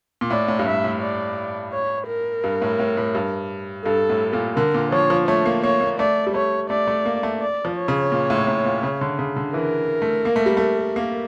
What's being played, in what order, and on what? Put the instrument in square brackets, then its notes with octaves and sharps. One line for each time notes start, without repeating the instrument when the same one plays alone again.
[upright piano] A#2
[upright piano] A2 [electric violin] D5
[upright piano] A2
G2
[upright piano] A2 [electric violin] E5
[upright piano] A2
[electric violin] D5
C#5
A#4
[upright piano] G2
A2
A2
A2
G2
[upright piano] G2 [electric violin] A4
[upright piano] A2
A#2
[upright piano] D3 [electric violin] A#4
[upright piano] A#2
[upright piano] F3 [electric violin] C#5
[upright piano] F3
[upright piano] A3 [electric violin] C#5
[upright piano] A#3
[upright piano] A#3 [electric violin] C#5
[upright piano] A#3
[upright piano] A3 [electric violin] D5
[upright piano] G3
[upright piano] A3 [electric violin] C#5
[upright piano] A3 [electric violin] D5
[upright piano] A3
A#3
A3
[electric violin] D5
[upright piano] F3
[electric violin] C#5
[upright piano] C#3
A#2
A2
A2
A#2
C#3
D3
C#3
D3
[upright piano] E3 [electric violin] A#4
[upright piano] A3
A#3
A3
G3
A3
A#3